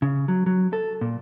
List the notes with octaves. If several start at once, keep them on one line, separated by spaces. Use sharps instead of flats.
C#3
F#3
F#3
A4
A#2